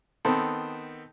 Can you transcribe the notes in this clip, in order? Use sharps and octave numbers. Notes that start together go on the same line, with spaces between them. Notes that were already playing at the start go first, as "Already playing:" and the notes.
D#3 B3 C4 A4